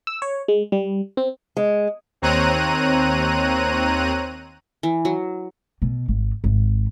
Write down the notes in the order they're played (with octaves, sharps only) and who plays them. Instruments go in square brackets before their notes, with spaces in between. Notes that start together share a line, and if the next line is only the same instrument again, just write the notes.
[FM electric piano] E6
C#5
G#3
G3
C4
[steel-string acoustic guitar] G#3
[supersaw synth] D#2 C4 C#5 A#5 F#6 D#7
[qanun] E3
F#3
[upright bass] B2
G#1
G#1